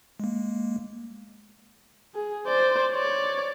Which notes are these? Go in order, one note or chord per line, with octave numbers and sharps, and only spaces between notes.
G#3 A#3
G#4
C5 D5
C#5 D5